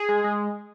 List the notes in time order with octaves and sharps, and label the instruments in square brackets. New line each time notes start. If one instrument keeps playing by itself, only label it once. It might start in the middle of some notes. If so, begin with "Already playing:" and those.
Already playing: [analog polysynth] G#4
G#3
G#3